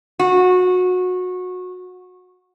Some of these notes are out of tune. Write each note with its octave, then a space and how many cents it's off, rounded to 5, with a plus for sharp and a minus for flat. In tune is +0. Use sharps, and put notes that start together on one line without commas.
F#4 -25